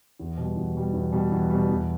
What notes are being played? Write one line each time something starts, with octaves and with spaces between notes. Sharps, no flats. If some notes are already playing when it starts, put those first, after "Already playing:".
E2
B2 G3
E2
B2 G3
E2
B2 G3
E2
B2 G3
E2